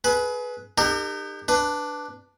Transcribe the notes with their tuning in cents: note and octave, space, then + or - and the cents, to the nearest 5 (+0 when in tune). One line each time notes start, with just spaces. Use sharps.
G#4 +30 B4 -5
D#4 -35 G4 +30 A#4 -35
D4 +0 B4 +5